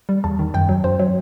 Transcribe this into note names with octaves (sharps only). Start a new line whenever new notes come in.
G3
E2 A5
D#3
F#2 G5
F#3
F#2 C5
F#3